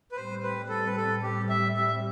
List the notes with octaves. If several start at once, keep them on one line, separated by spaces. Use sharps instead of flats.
B4
A2 G3 C4 C5
B4
A4
B4
A4
G4
E5
E5